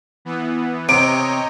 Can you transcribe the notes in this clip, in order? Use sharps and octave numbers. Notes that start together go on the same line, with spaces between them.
E3 B3
C3 C#5 D#5 G5 A#5 D7